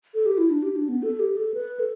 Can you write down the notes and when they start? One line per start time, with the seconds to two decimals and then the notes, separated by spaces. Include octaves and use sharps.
0.14 A4
0.26 G4
0.38 E4
0.50 D4
0.62 G4
0.76 D4
0.88 B3
1.03 A4
1.19 G4
1.37 A4
1.54 B4
1.79 A4